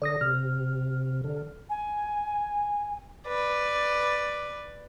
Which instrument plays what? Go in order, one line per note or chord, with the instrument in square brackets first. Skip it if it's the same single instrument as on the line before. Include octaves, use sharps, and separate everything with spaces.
[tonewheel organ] D3 [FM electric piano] D5 D#6 A#6
[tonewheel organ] C3 [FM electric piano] F6
[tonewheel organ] D3
[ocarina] G#5
[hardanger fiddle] B4 D5